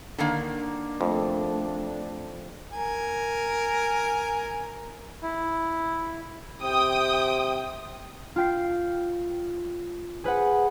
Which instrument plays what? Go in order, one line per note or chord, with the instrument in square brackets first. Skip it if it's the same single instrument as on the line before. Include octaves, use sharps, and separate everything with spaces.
[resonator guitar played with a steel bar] D3 D#3 A#3 [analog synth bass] D4
[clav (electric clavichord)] F2 [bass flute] A3
[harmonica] A#4 G#5
[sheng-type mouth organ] E4
[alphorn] C3 [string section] G5 D#6
[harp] F4 G5 C7
G#4 B4 C5 F#5